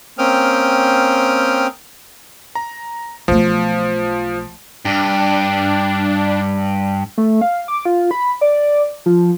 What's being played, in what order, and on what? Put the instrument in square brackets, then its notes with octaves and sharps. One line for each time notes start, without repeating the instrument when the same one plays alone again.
[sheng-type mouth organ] A#3 C4 C#4 G5 D#6 F6
[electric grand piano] A#5
[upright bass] B1 A3 [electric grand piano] F3
[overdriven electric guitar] G2 [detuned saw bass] D4
[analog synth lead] A3
F5
D6
F4
B5
D5
F3